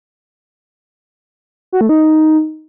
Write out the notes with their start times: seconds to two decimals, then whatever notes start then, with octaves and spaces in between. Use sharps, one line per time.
1.72 F#4
1.81 A3
1.89 D#4